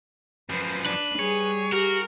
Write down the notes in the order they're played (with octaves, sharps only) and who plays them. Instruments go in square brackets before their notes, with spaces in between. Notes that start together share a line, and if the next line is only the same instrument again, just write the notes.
[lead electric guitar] F#2 F3 [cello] B4 C5
[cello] D4 [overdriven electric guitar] B4
[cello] G3 G#4 [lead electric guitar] C#5
[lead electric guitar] F#4 [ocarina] G4 [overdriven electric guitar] A#4